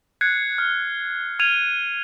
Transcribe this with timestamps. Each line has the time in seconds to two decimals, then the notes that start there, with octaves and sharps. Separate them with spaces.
0.21 F#6 G#6 C7 C#7
0.58 F6
1.39 F6 G#6 D#7 F7